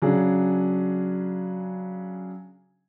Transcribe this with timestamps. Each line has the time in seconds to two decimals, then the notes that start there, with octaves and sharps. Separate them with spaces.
0.02 C#3 F#3 D4 G#4